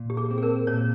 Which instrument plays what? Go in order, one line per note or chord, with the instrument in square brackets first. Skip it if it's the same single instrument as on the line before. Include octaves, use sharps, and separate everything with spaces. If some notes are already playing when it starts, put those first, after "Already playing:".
Already playing: [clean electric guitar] A#2
[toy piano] G4
G#4
[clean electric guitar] C4
[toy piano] G#4
A#4
[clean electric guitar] A#2 [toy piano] C#5